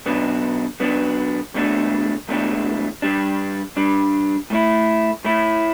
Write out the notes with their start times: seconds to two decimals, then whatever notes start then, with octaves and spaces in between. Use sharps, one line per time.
0.06 B1 B2 B3 D4
0.80 B1 B2 B3 D4
1.54 E2 B2 A3 D4
2.28 E2 B2 A3 D4
3.02 G2 G3 D4
3.76 G2 G3 D4
4.50 A2 A3 E4
5.24 A2 A3 E4